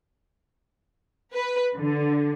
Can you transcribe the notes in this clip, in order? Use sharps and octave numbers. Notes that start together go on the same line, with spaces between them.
B4
D3